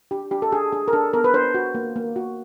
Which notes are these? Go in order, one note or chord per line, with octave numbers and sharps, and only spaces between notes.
D4 G4
D4 G4
A4
D4 G#4
D4 G#4
A#4
D4 A4
B3 A#4
B4
D4 C5
F#4
A#3
A#3
F#4